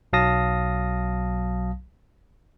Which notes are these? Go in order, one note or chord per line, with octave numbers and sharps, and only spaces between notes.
B1 F#3 F5 A5 D#6 A#6